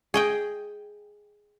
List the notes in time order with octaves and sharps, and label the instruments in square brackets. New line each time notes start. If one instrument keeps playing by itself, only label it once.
[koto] G#4 D#5 G5